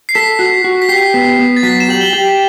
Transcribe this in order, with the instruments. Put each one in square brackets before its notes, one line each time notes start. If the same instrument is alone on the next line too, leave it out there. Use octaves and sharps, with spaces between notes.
[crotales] C7
[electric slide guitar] A4 [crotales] B6
[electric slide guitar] F#4
F#4
[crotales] B6
[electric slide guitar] G4 [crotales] C7
[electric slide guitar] B3
B3
[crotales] A6
[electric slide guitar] F#3 [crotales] B6
[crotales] E7
[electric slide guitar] G4 [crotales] F#7
[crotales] G7
[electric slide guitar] G4